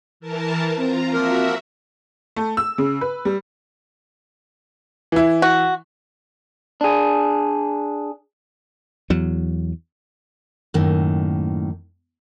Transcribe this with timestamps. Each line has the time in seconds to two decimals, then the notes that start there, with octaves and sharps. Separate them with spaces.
0.20 E3 A#4 A5
0.77 C4 F4 A#5
1.13 F3 A#3 F#4 A#4 E5
2.36 A3
2.57 E6
2.78 C#3
3.01 B4
3.25 G3
5.12 E3 E4
5.42 F#4
6.81 D4 G#4
9.10 E2 F#3
10.74 F#2 A2 D#3 A#3